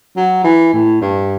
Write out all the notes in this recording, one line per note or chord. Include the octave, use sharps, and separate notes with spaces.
F#3
E3
A2
G2